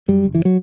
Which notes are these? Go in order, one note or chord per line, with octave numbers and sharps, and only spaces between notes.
F#2 G3
F#1
E3
F#3